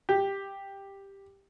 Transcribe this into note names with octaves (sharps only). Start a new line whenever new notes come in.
G4